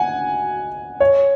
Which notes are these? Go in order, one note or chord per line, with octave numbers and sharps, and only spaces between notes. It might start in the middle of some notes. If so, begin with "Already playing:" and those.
Already playing: F#5 G#5
C#5